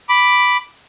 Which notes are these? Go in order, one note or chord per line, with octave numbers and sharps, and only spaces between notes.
B5 D6